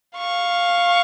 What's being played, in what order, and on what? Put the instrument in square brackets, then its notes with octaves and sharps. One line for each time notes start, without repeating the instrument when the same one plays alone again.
[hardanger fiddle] F5 [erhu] C#6